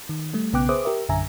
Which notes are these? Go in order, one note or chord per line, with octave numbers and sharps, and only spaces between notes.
D#3
G3 A3
B1 C#3 B3 G5 D6 F#6
G#4 B4 C5 E5 D6 D#6
G4 A#4 E5
A#1 F#2 D3 E5 G#5 A#5